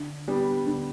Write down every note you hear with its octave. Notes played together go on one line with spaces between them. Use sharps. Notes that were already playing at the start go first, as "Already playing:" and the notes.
Already playing: D3
G3 B3 D4 G4
D3